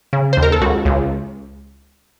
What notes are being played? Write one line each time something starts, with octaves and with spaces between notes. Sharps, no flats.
C#3
D#2 C5
A#4
A4
C#2 F#4
C#2